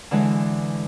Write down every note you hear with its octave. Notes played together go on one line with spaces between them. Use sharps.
D3 E3 G#3